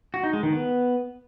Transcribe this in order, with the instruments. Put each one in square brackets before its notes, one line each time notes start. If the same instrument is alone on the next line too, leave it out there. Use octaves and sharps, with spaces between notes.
[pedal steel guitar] F#4
D#4
G#3
D#3
B3